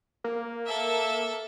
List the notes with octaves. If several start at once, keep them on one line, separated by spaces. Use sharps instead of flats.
A#3
A4 E5